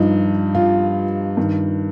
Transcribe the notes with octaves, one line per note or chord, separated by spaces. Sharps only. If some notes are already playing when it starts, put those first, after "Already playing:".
Already playing: G2 F3 D#4
F4
G2 D#3